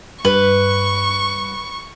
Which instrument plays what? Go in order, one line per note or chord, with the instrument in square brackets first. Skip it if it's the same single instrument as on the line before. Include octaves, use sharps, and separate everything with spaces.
[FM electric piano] G2 [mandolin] B4 [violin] C#6